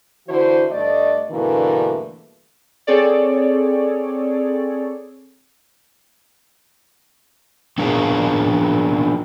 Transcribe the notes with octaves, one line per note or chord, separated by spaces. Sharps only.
D3 E3 E4 F#4 C5
G2 A3 D5 D#5
G2 B2 D3 E3 A3 A#3
C4 G#4 A4 C#5 D5
A#3 B3 D4 G#4 A#4 F5